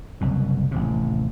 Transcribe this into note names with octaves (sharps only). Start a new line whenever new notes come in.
F#1 C2 B2
A1 D#2 C3